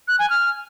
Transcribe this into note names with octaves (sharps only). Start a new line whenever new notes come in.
F#6
G#5
F6